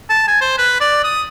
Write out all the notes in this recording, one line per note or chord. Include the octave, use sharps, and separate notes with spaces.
A5
G#5
C5
B4
D5
D#6